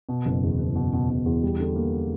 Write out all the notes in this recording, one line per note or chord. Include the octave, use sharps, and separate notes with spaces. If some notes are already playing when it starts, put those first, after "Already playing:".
B2
F#1
E2
F#1
B2
B2
B2
E2
G3
D3
A#3